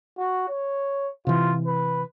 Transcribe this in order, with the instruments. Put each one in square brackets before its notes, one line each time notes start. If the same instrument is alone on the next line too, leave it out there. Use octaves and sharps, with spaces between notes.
[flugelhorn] F#4
C#5
[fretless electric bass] C3 E3 [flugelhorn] F4
[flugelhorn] B4